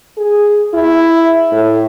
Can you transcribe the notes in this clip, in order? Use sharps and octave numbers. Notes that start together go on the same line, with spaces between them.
G#4
E4
A2